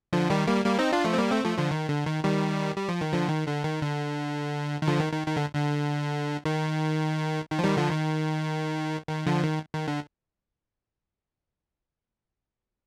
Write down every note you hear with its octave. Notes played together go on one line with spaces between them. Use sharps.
D3 F3
D#3 G3
G3 A#3
G3 A#3
C4 D#4
D4 F4
F3 A3
C4
G3 A#3
A3 C4
F3 A3
D3 F3
D#3
D3
D#3
D#3 G3
G3
F3
D#3
D3 F3
D#3
D3
D#3
D3
D#3
D3 F3
D#3
D#3
D#3
D3
D3
D#3
D#3
F3
D#3 G3
D3 F3
D#3
D#3
D3 F3
D#3
D#3
D3